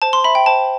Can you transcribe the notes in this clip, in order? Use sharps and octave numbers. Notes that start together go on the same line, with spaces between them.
C5 A5
C6
E5 B5
G5
C5 A5